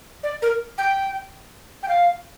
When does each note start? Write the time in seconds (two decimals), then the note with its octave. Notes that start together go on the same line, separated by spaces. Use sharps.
0.23 D5
0.42 A#4
0.78 G5
1.83 G5
1.88 F5